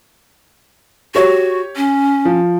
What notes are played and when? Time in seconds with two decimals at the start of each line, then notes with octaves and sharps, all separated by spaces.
1.15 F#4 G4 C#5
1.76 C#4
2.25 F3